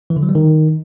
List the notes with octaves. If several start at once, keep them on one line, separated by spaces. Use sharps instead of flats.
E3
D3
F#3
G3
D#3